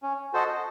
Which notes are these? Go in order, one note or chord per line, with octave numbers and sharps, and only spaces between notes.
C#4
F#4 A4 C5 D#5